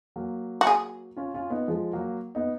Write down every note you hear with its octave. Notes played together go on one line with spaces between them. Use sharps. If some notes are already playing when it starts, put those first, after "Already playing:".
F#3 A#3
F#4
G#4
C#4 F4
C#4 F4
B3 D#4
F3 G#3
F#3 A#3
B3 D#4